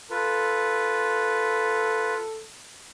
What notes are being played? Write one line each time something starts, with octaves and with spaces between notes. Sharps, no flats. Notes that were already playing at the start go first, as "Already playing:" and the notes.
F4 A4 B4